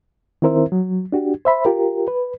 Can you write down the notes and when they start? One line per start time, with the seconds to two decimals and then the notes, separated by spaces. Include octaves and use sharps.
0.42 D#3 C4 E4 A#4 C5 E5
0.72 F#3
1.12 D4 F#4 G4
1.45 C5 E5 B5
1.65 F4 G4 A#4
2.08 B4